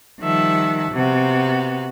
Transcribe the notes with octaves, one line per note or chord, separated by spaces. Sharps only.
D#3 F3 G3 E5 F#5 A5
C3 B3 F#4